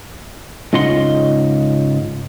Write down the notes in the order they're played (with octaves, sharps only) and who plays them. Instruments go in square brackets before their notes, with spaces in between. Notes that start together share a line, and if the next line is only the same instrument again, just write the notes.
[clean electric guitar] G#2 C#3 F4 D#5 F#5 C6